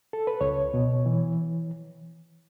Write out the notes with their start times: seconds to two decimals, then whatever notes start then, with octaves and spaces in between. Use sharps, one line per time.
0.13 A4
0.27 B4
0.41 C#2 C#5
0.74 B2
1.06 E3